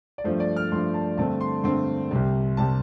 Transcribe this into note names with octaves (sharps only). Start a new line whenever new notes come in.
D5
G2 F3 A3 C5
D5
F6
G2 F3 A3 C6
A5
G2 D3 A3 C4 A5
C6
G2 D3 A3 C4 C6
C2 C3 G3
C3 G3 A5